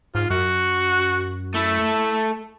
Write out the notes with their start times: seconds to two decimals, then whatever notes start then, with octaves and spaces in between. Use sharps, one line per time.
0.15 G#2 F4
0.30 F#2 F#4
1.55 A3 E4